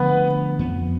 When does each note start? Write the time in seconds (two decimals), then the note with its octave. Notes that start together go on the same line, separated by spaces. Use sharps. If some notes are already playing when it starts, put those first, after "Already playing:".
Already playing: D3 F3 A3 B3 B4
0.59 F2 F3 B3